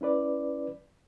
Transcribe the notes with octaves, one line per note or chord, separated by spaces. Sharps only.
C#4 E4 B4 D5